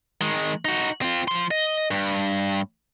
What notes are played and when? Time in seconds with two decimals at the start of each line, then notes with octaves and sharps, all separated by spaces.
0.21 D#3 G#3
0.65 D#4 F#4
1.02 C4 F4
1.28 F3 C6
1.51 D#5
1.91 G2